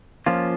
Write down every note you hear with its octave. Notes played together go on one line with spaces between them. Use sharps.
F3 A#3 C#4 F4